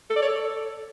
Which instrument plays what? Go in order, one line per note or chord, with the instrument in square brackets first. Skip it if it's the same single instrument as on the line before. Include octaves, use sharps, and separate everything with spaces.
[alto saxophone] A4
D5
C#5
A4